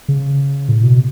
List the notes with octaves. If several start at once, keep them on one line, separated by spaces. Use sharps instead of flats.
C#3
A2
B2